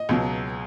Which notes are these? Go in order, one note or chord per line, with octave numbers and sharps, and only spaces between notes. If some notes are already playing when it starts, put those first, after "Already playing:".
Already playing: D#5
C#2 B2 F#3